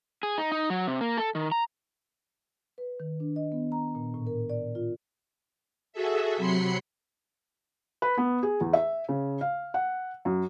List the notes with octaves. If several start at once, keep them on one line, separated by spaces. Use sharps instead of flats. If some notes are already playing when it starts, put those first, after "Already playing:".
G#4
D#4
D#4
F#3
C3
A#3
A4
D#3
A#5
B4
D#3
D4
D#5
B3
A#5
A#2
A2
A#4
D5
F4
F#4 G#4 A4 E5
C3 F#3 B5 C6 C7 C#7
B4
B3
G#4
E2
E5
C#3
F5
F#5
F#2